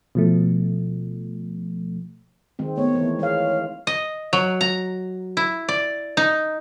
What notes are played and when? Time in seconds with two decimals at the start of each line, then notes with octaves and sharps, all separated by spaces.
0.15 B2 F3 A3
2.59 D#3 G#3 C4
2.78 A3 B3 C#5
2.95 E3
3.19 G#3 C#5 F5
3.87 D#5
4.33 F#3
4.61 A#5
5.37 E4
5.69 D5
6.17 D#4